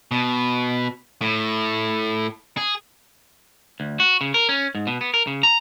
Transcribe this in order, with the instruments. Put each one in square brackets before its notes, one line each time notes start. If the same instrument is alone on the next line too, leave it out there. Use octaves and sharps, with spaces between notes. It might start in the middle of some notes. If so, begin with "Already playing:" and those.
[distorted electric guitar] B2
A2
G#4
[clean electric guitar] D2
F#4
C#3
A#4
C#4
G#2
B2
B3
A#4
C#3
A#5